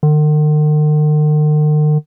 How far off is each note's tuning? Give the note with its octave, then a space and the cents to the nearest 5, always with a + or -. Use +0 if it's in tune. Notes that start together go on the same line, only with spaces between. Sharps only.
D#3 -45